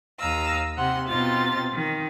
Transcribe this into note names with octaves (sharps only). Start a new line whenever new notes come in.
D#2 D#5 F5 A#5 E6
C3 F#5 C6
B2 C4 D#4 F4 A6
D#3